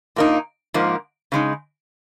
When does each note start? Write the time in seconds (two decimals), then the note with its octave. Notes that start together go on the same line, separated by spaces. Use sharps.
0.16 A#2 A#3 D#4
0.74 G#2 F3 A#3
1.32 C#3 G#3 D#4